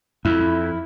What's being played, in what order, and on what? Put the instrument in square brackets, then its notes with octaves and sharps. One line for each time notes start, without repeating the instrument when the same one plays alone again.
[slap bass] F2 [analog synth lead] E4